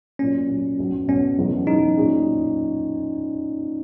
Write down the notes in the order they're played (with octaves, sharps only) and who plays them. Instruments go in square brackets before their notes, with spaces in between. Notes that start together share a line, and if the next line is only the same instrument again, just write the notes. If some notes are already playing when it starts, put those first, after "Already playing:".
[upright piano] A#2 F#3 A#3 [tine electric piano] C#4
[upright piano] A#2 F#3 A#3
B1 B2 F#3
[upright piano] B1 B2 F#3 [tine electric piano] C#4
[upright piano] F#1 E2 B2
[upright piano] F#1 E2 B2 [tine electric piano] D#4
[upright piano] A#2 F#3 C#4 G#4